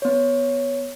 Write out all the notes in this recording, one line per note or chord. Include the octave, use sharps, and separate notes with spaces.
B3 C#5